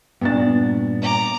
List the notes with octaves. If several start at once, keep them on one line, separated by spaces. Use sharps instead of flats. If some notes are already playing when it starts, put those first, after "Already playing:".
G2 A#2 B3 D4 A6
A#5 D6